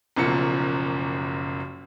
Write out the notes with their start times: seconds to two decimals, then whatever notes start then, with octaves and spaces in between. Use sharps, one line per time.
0.16 F#1 B1 F#2 F3 C#7